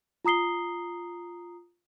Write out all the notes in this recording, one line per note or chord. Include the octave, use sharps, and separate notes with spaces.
F4 A#5 D#6 C7 G7